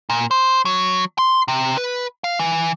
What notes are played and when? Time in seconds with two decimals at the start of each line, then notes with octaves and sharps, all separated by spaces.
0.10 A#2
0.31 C5
0.65 F#3
1.18 C6
1.48 C3
1.77 B4
2.24 F5
2.39 E3